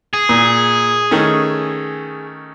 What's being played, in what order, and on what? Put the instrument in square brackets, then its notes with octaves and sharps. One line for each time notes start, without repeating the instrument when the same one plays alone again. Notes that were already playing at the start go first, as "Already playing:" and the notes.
[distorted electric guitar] G#4
[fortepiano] A#2
D#3 A3 C#4